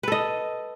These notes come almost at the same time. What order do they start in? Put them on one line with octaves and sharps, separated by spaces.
B4 A4 D#5